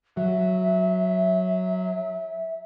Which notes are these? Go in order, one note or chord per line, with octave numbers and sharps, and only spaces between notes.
F#3 E5